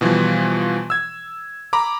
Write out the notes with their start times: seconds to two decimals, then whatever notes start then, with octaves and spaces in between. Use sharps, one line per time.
0.01 B2 E3 F3 G3
0.90 E6 G#6
1.73 A#5 B5 D6